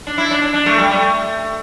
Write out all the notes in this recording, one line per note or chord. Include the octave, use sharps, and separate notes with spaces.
D4
E4
D4
D4
D4
A3
G3
A3